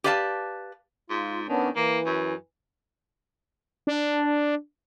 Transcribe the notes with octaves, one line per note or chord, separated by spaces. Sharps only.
G4 B4 D5 F5 G#5 A5
G#2 F4
D#3 B3 C#4 D4
E3 A#3
F#2
D4